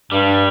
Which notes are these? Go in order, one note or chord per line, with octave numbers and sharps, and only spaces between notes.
G2 G3